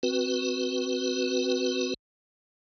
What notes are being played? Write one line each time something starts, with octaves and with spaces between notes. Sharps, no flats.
C4 F#4 B4